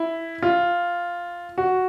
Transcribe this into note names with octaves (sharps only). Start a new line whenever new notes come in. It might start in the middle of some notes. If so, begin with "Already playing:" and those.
Already playing: E4
F4
F#4